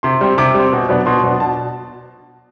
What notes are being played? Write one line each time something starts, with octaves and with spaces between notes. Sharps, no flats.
C3 C6
G3 C4
C3 D6
G3 C4
B2
F#3 B3 D4
B2 C6
F#3 B3 D4
B2 A5